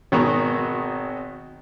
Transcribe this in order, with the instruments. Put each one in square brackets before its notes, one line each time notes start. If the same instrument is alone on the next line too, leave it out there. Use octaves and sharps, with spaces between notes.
[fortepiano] G#1 B2 D#3 F#4 G#4 A#5